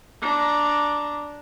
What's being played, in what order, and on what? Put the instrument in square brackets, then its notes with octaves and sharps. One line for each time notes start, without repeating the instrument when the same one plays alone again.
[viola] D4 A#5